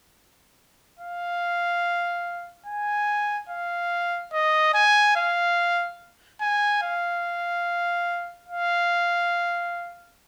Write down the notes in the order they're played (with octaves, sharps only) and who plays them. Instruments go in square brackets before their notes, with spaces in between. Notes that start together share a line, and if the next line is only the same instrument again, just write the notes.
[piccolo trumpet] F5
G#5
F5
D#5
G#5
F5
G#5
F5
F5